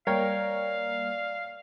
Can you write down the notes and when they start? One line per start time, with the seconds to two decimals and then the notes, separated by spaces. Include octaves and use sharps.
0.07 G3 A#3 A#4 C#5 D5 F5 G5